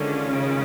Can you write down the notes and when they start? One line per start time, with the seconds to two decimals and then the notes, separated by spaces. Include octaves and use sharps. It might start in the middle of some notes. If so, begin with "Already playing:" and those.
Already playing: D3 D#3 G#3 C#4 F4
0.31 C#3